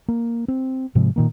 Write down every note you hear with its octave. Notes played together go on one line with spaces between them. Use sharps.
A#3
C4
G#2 C3 F3 G#3
A#2 D#3 A#3